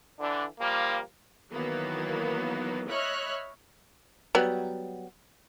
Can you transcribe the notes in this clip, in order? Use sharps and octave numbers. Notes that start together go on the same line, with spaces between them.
D3 E3 D4
F3 G3 A#3
D#3 E3 F#3 A#3 B3
C#5 D#5 E5 B5 F6 F#6
F#3 G3 B3